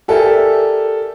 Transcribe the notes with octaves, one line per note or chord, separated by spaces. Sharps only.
G4 A4 A#4 D5 E5 G#5